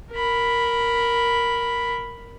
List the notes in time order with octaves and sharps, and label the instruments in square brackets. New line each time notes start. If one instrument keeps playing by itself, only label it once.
[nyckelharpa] A#4 B5